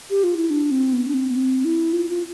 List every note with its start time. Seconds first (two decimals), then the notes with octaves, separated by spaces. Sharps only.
0.10 G4
0.24 F4
0.37 E4
0.50 D4
0.71 C4
0.93 B3
1.08 D4
1.14 C4
1.30 B3
1.36 C4
1.65 E4
1.93 F4
2.10 F4